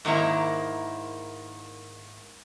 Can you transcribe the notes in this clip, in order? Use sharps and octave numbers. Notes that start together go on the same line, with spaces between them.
G#2 D#3 A#3 E4 A#5